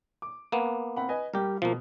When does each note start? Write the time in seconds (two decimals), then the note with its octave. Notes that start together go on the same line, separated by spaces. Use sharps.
0.22 D6
0.52 A#3 B3
0.97 C4 F#5 B5
1.09 B4 D#5 G#5
1.33 G3 G4 A#4
1.62 B2 F3 A#3